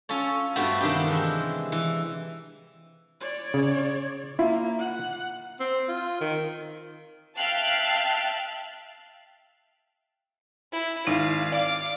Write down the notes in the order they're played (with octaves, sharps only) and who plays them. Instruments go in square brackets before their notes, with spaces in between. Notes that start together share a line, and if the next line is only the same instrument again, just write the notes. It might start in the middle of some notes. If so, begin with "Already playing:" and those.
[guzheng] C#4 F4 A4 C#5
G2 A3 B3 C4 F4 F#4
C3 D#3 D4 G4
E3 G#3
E3
[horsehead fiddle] C#5 D5
[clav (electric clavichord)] C#3
[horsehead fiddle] A#3 [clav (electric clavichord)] E4 F4
[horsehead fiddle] F#5
[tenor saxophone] C4
F4
D#3
[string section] E5 F5 G5 A5 F6 F#6
[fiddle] E4
[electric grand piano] G#1 [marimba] D#4 E4 [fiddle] F5
[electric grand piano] D5 [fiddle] F5 D6